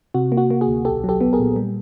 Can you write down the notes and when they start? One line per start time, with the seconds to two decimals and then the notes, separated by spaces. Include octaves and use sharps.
0.14 C3 F#4
0.32 A#3
0.37 F#4
0.50 A#3
0.61 F#4 G#4
0.68 D2
0.85 B1 G4 A4
1.04 F#3
1.09 G4 A4
1.21 B3
1.33 G#4 A#4
1.39 A#2
1.56 G3